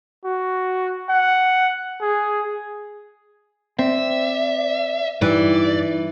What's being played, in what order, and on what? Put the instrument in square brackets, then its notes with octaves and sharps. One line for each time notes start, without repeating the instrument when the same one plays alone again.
[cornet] F#4
F#5
G#4
[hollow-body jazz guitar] C4 [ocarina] D5 [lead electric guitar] E5
[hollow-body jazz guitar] G2 [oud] E3 [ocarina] D#4 [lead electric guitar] D5